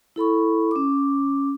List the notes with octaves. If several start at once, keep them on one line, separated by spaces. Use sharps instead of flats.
E4 A4 B5 C#6
C#4 D6